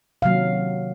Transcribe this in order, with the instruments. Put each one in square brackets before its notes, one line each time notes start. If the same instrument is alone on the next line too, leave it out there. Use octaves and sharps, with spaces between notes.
[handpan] C3 D#3 F#3 A#3 F5